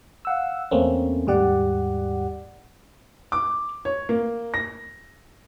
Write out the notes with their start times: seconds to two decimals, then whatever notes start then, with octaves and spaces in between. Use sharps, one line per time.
0.25 F5 F#5 E6
0.71 E2 A3 A#3 C4 C#4
1.27 D#2 G#2 G3 G4 D5 F#5
3.32 D6
3.85 C#5
4.09 A#3
4.54 A#6